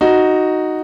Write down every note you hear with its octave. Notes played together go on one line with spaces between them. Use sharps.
D#4 F#4